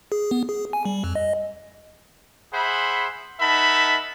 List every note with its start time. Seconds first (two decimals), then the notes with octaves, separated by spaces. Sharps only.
0.12 G#4
0.31 B3
0.49 G#4
0.73 G#5
0.85 G3
1.04 F2
1.15 D#5
2.53 G#4 C5 E5 F#5 B5
3.40 D#4 A#4 E5 F#5 A5 B5